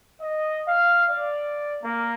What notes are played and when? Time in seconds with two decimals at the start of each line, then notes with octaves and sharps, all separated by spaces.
0.20 D#5
0.68 F5
1.10 D5
1.82 A#3